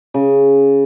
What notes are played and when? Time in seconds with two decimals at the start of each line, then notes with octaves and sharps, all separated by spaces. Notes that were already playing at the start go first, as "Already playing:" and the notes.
0.14 C#3